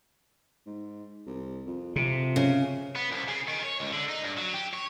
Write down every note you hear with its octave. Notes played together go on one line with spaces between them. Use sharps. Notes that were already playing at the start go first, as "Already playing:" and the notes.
G#2
C2
F2
F2 C3
C#3
B3
C2
C#3
D#3
C#5
C#2
D3
D#4
G2
F#3
G4
C#5